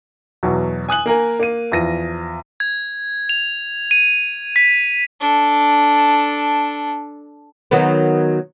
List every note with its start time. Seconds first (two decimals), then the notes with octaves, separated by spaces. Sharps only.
0.43 E2 B2 F#3
0.89 G#5 D#6 F#6 F#7
1.06 A#3 A#4 G#5
1.39 A#3 D#7
1.72 E2 F3 A#6 D#7
2.60 G#6
3.29 F7
3.91 D#7
4.56 B6
5.21 D4 A4
7.71 D#3 F#3 B3